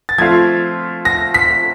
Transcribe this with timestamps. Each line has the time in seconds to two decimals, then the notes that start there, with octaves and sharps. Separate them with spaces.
0.09 A6
0.18 F3 A3 C4 F4 G#6
1.05 A#6
1.34 B6